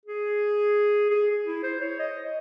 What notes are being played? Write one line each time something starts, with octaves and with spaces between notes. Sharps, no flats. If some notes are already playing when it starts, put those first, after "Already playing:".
G#4
G#4
E4
C5
C#5
D#5